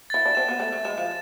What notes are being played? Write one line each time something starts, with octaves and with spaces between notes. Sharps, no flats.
E4 A6
D4
C4 E7
B3
A3 A6
A3
G#3 E7
F3